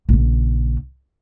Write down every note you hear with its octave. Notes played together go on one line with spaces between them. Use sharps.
A#1 C#3